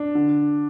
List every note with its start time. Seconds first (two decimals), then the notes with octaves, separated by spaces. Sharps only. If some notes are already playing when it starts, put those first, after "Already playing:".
Already playing: D4
0.15 D3